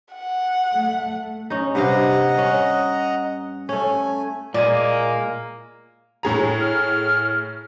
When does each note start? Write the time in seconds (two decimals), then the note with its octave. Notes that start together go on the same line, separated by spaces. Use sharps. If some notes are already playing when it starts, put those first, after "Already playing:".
0.14 F#5
0.74 A3
1.50 C#4 D#4
1.75 G2 C3 D#5 F5 F#5 A#5
2.38 C#4
3.69 A3 C#4 A4 G#5
4.54 A#2 G#3 A#3 D5 G#5
6.23 A2 G#4 A#5
6.61 F6